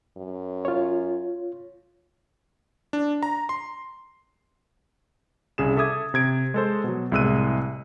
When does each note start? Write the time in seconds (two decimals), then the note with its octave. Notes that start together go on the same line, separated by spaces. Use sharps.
0.17 F#2
0.65 F4 C#5
2.93 D4
3.23 A#5
3.49 C6
5.58 C2 C#3 G#4 E7
5.76 A4 E5 D6 D#6 G#6
6.14 C3 G#6 D7
6.54 G#3 A4 C5
6.84 B2 F#3
7.12 C2 A2 G#3 E6 F#6 D#7